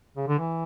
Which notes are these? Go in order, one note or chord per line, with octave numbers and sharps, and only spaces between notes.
C#3
D3
E3